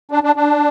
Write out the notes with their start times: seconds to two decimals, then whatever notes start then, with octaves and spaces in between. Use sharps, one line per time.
0.11 D4
0.24 D4
0.36 D4